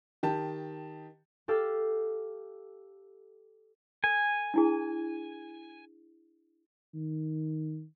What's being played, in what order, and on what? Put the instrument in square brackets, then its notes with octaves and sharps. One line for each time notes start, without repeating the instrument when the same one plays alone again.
[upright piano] D#3 G4 A5
[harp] G4 A4 F5
[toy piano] A4 [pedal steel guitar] G#5
[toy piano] D4 E4 G#4
[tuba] D#3